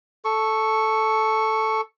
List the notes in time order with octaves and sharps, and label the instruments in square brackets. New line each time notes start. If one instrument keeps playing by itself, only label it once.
[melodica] A4 C#6